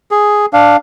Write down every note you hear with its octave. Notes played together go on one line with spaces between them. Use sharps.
G#4
D4 F5